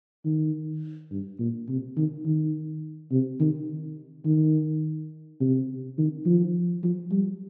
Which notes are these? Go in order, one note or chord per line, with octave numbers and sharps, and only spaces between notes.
D#3
G2
A#2
C3
D#3
D#3
C3
D#3
D#3
C3
D#3
F3
F3
G3